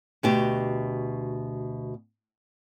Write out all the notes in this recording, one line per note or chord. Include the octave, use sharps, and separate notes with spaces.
D2 B2 G4